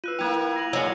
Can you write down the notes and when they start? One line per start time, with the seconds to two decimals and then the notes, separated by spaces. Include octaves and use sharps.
0.04 F4 B4 E6 F#6 D#7
0.19 A#3 E4 G5 F#6 G#6 F7
0.56 A#6 F7 F#7
0.73 F#3 G#3 A#3 E4 F4 E6 G#6 C#7